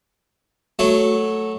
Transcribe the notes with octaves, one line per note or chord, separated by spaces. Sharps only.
F#3 A3